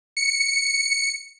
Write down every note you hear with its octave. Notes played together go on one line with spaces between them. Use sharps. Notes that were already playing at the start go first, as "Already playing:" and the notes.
C#7